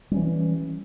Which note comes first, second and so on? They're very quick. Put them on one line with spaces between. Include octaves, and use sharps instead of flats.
G3 C#4 E3